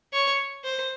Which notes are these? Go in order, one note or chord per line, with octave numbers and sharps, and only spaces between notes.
C#5
C5